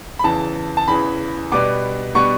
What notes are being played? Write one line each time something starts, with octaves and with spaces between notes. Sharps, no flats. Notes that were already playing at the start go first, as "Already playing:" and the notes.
B5
E2 C#3 E3 A5
A5
E2 C#3 E3 B5
B2 G3 B3 D4 D6
B2 G3 B3 D4 C#6